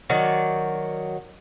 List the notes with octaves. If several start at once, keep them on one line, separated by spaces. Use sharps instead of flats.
D#3 F#3 D5